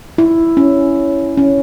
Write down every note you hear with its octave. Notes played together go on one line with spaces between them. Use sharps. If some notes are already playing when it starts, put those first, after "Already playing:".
E4
C#4
C#4